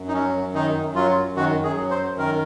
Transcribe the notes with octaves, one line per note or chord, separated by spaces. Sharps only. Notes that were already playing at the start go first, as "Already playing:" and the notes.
Already playing: F#2
D#4
F#3 C#4
F#2
D#3 D#4
F#2
F#3 F4
F#2
D#3 F#4
F#2
G#4
F#3
C5
F#2
D#3 A#4